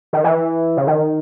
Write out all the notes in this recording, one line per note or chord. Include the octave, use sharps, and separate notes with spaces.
D#3
E3
C#3
D#3